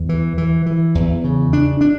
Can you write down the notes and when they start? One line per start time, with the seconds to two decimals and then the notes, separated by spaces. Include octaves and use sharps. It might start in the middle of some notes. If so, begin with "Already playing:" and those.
Already playing: E2
0.09 E3
0.38 E3
0.66 E3
0.95 E2
1.24 C#3
1.53 D4
1.81 D4